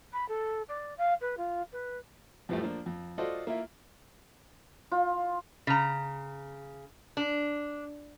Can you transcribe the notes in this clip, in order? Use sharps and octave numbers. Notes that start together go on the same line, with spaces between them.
B5
A4
D5
F5
B4
F4
B4
F2 A2 E3 F3 G3 A3
F3 A#3 D4
F2
F4 F#4 A4 C5 D5 D#5
A#3 E4 F4 E5
F4
C#3 A#5
D4